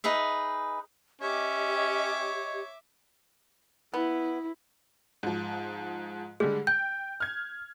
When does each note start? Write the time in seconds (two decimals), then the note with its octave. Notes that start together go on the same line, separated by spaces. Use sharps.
0.04 D#4 G#4 B4 E5
1.22 C#4 G4 C#5 D#5 E5 D6
3.94 B3 E4
5.23 G#2 F3
6.40 D3 G3 G#3 G#4
6.67 G5 G6
7.20 F6 G#6